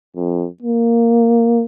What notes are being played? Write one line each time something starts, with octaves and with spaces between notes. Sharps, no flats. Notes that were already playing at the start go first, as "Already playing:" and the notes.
F2
A#3